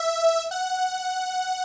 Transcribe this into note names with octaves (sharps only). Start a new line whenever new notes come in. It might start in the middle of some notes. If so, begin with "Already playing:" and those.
Already playing: E5
F#5